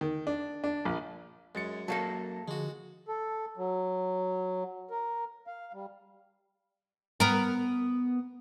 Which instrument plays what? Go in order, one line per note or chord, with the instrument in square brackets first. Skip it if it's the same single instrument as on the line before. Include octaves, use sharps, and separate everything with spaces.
[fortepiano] D#3
D4
D4
A#1
[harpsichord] F#2 [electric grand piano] G#3 A6 C#7
[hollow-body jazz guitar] F#3 A#3 A4 [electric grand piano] A5
[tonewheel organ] D3 F3 G#4 [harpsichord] G#3 F#4
[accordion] A4
F#3
A#4
F5
G3
[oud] B3 A#4